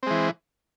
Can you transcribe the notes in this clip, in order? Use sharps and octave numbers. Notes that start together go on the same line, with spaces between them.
E3 G#3 C4